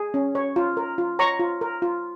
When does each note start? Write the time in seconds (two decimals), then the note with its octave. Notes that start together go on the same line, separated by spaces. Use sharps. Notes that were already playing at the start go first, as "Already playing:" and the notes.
Already playing: G#4
0.14 C#4
0.35 C#5
0.56 F4
0.77 A#4
0.98 F4
1.19 C#5 A#5 C#6
1.40 F4
1.61 A#4
1.82 F4